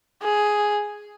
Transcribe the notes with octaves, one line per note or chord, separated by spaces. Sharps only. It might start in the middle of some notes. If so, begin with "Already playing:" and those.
G#4